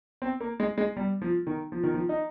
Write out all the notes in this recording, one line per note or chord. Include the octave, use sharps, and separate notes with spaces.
C4
A#3
G#3
G#3
G3
F3
D#3
F3
D#3
F3
D#4